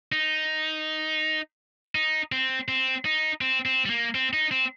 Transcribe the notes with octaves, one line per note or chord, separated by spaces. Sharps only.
D#4
D#4
C4
C4
D#4
C4
C4
G3
A#3
C4
D#4
C4